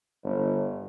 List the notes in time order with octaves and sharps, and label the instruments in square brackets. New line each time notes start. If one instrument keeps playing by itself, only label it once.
[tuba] G1